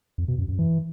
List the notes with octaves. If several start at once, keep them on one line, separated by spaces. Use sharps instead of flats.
F2
B2
F#2
F#2
E3